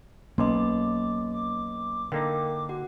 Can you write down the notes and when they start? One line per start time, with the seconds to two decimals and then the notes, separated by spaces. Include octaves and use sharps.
0.38 B1 A#3 C#4 D#5 C6 D6
1.33 D6
2.12 D3 A#3 D#4 A#4 F5 G5
2.69 F#4 F#5